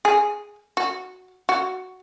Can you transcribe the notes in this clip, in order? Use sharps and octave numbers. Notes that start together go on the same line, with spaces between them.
G#4
F#4
F#4